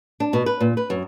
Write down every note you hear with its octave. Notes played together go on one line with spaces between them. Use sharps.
D4
B2
B4
A#2
B4
F#2